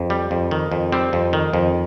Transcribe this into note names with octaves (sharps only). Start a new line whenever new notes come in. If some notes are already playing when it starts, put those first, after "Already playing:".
Already playing: F2
G3
F2
D#3
F2
G3 C4
F2
D#3
F2